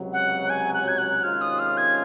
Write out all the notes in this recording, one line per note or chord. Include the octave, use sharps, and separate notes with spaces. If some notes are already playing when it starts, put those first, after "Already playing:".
Already playing: C#2 C3 F#3
F#5
G#5
F#6
G#6
F#6
C3 D#3 G#3 C#4 F4 F6
D#6
F6
G#6